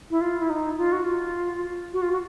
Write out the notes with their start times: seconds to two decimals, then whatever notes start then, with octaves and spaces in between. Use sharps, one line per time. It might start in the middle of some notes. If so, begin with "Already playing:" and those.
0.11 E4
0.21 F4
0.40 E4
0.50 D#4
0.78 F4
0.92 F#4
1.04 F4
1.93 F#4
2.02 F4
2.12 F#4